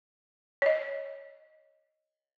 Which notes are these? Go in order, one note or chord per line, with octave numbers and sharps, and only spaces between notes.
C#5 D#5